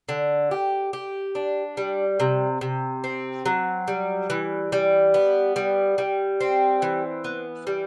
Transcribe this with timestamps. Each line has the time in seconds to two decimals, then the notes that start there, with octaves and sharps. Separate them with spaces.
0.09 D3
0.51 G4
0.93 G4
1.35 D4
1.77 G3
2.20 C3
2.61 C3
3.04 C4
3.46 F#3
3.88 G3
4.30 E3
4.72 G3
5.14 B3
5.56 G3
5.98 G3
6.41 C4
6.82 E3
7.24 B3
7.67 G3